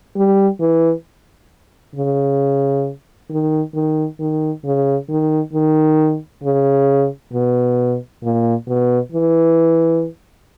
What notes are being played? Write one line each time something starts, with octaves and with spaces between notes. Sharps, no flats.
G3
E3
C#3
D#3
D#3
D#3
C#3
D#3
D#3
C#3
B2
A#2
B2
E3